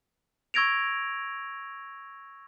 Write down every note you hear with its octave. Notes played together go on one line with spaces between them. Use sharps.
C#6 E6 G#6 A#6 D7 F7